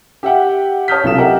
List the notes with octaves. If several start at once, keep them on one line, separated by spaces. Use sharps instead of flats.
G4 E5 F#5 G5
C#5 A5 D#6 F6 G6 B6
B1 F#2 C3 F4 A4 E7
G4 A#4 D#5 E5 F#5